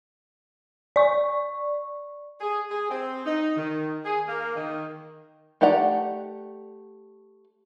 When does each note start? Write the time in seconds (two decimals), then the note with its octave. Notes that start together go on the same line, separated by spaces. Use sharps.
0.96 D5 C#6
2.41 G#4
2.70 G#4
2.90 C4
3.26 D#4
3.56 D#3
4.05 G#4
4.27 A#3
4.56 D#3
5.61 A3 G4 D5 F#5 A#5